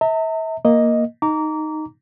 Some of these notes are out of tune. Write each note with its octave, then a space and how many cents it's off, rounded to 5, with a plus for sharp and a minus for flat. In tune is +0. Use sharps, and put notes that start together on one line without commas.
E5 -35 A#5 -45
A#3 +0 D#5 +0
D#4 +0 A#5 -10 D6 -30